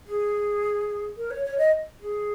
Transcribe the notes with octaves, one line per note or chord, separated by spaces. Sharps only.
G#4
A#4
C#5
C#5
D#5
G#4